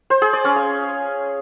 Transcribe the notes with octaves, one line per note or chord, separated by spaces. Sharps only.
C5
G#4
D5
C#4
F5